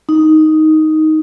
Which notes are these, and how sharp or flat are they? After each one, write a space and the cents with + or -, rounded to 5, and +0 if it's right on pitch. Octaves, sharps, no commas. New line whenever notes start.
D#4 +5